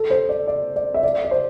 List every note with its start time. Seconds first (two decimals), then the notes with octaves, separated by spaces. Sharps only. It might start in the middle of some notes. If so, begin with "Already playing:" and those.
Already playing: A4
0.10 C5
0.29 D5
0.47 D5
0.76 D5
0.94 E5
1.03 D5
1.25 D5
1.31 C5